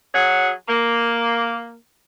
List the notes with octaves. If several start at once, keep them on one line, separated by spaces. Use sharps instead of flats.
F#3 G#4 C#5 F#5
A#3